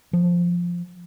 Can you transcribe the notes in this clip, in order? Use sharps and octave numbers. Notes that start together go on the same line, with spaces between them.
F3